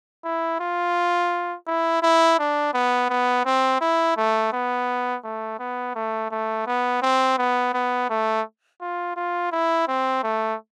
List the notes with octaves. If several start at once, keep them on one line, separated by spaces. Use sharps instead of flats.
E4
F4
E4
E4
D4
B3
B3
C4
E4
A3
B3
A3
B3
A3
A3
B3
C4
B3
B3
A3
F4
F4
E4
C4
A3